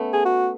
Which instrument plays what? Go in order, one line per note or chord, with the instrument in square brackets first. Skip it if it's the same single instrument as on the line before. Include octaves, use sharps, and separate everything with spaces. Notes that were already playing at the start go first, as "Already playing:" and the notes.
Already playing: [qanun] A3 B3 C#4
[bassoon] G#4
F#4